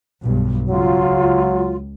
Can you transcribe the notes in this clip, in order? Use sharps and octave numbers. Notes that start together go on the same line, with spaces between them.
B1 G2
C#2 F#3 F4